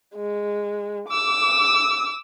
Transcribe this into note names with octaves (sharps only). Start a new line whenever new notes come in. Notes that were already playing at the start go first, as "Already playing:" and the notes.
G#3
D6 E6